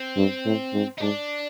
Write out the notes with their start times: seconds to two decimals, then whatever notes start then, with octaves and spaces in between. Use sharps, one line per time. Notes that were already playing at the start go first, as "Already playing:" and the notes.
Already playing: C4
0.17 G2
0.46 A2
0.74 G#2
0.98 D#4
1.01 G#2 D4